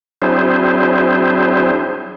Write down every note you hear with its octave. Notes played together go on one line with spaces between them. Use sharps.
F#3 C4 D4 E4 G#4 C5